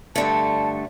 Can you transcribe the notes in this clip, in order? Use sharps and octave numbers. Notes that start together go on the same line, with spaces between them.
G2 D3 A3 A5